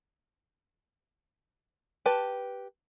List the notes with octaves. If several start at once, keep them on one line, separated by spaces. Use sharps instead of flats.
G4 B4 A5